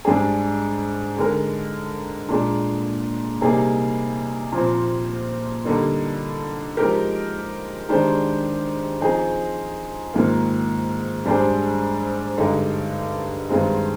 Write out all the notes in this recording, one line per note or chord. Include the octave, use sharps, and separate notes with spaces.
G#2 G3 D4 G#4
D3 G#3 D#4 A#4
A#2 G#3 D4
C3 G3 A#3 D#4 G#4
A#2 F3 C4
D3 G3 A#3 D#4
F3 G#3 D#4 G4 A#4
D#3 G#3 D4 G4 C5
F3 C4 D#4 G#4 C5
G#2 D#3 A#3 F4
G#2 G3 D4 G#4 C5
G2 D3 G#3 D#4 G4
G2 D#3 G#3 C4